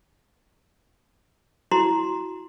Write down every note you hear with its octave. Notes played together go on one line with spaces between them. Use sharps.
E4 F#4 A#5 C6